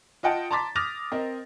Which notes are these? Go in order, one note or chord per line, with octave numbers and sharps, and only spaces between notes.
F4 D#5 F#5 G5 A5
A5 A#5 C6 D6 A6 B6
D6 D#6 F6 A6 A#6 F7
C4 A#4 D#5